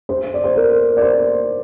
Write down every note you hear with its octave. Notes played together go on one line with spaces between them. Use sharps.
C5
D5
C5
A#4
D5
C5